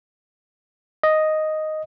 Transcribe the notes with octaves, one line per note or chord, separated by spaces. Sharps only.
D#5